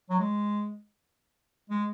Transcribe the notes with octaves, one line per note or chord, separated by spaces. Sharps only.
F#3
G#3
G#3